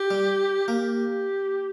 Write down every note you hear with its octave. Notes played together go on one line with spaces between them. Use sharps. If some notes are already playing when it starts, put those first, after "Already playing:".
Already playing: G4
G3
A#3 G4